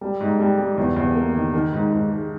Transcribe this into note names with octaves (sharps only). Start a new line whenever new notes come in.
G3
G#2
G3
G3
E2
E2
A#3
D#3
D#3
G#2
G#2
G#3